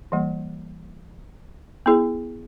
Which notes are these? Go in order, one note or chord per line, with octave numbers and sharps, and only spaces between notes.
E3 G3 A#3
B3 E4 G#4